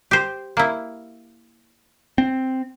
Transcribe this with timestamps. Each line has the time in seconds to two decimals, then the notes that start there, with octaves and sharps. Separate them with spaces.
0.11 G4 C5
0.57 A#3 E4
2.18 C4